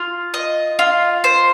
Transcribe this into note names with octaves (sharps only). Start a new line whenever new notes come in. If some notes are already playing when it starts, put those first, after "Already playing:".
Already playing: F4
D#5
F4
C5